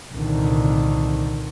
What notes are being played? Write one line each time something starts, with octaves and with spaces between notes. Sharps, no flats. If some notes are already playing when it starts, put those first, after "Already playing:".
C2 A#2 D3 D#3